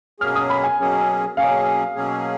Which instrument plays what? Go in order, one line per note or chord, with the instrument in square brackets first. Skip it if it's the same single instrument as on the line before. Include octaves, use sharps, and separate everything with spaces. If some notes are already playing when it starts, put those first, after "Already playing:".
[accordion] B2 F#3 A#3 C#4 G#4 [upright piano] F6
[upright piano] D#6
B5
G#5
[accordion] B2 F#3 A#3 C#4 G#4
[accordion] B2 F#3 A#3 C#4 G#4 [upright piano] F5
[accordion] B2 F#3 A#3 C#4 G#4